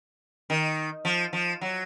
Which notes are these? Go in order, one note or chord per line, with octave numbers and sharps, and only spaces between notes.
D#3
F3
F3
F#3